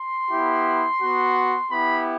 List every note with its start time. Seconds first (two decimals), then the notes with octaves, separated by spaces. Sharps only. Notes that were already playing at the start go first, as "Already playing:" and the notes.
Already playing: C6
0.30 B3 E4 G4
1.00 B3 F#4
1.70 B3 E4 G4 B5